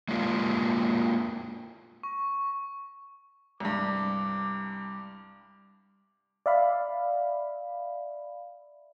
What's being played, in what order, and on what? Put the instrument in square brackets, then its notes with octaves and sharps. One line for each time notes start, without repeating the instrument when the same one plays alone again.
[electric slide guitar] G#3 A#3 D4 F4 G4 A#4
[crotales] C#6
[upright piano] C2 G2 [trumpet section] D6
[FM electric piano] D5 E5 F5 B5